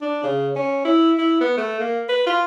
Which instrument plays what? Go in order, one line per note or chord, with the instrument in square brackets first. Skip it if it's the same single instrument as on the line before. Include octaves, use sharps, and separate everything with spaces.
[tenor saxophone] D4
C#3
C#4
E4
E4
B3
A3
A#3
B4
F4